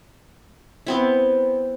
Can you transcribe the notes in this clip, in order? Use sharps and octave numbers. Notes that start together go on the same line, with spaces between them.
B3 C4 E4